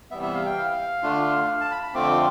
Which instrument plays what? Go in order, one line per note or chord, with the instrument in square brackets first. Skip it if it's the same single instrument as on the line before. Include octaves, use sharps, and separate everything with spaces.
[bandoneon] C3 E3 G3 B3 E5
E5
F5
G5
F5
D3 A3 D4 F4
A5
B5
B5
F2 D3 A3 C4 F4 D6